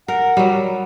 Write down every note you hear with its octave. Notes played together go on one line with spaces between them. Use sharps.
A#4 F#5
F#3 G3